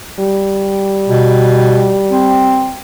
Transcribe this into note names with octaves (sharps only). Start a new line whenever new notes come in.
G3
B2
C4